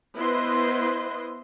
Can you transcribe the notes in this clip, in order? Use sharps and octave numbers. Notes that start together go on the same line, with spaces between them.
B3 E4 B4 C5 D#5 C6